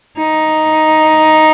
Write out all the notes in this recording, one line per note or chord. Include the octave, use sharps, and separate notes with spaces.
D#4